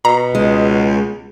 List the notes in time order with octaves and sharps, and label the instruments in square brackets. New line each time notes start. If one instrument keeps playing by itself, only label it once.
[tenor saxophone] B2 [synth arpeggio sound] A#5
[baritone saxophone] C#2 [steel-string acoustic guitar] G#3